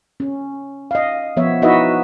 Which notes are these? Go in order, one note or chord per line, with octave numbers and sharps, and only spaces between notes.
C#4
D#5 F5
F3 B3 C#5 E5
D#4 E4 F#4 B4 D#5 E5